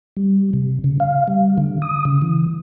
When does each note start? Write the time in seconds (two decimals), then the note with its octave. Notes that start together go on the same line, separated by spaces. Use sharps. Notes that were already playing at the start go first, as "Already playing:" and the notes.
0.17 G3
0.53 C3
0.84 C#3
1.00 F5
1.28 G3
1.58 D3
1.82 D#6
2.05 C#3
2.22 E3